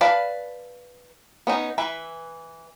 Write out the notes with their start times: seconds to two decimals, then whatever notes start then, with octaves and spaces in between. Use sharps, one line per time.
0.01 B4 D5 F5 A5 B5
1.47 B3 C#4 D#4
1.78 E3 B4 E5